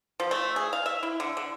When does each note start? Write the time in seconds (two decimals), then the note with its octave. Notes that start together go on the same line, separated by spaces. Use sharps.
0.20 F3
0.31 A3
0.56 G#4
0.73 F5
0.86 E5
1.03 E4
1.20 D3
1.37 D3